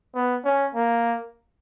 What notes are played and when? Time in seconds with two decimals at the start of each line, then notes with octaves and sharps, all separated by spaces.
0.15 B3
0.45 C#4
0.75 A#3